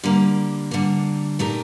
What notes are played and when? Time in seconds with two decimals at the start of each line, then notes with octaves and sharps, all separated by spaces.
0.03 D3 G3 A#3
0.71 D3 G3 A#3
1.39 A#2 A3 D#4 G4 A#4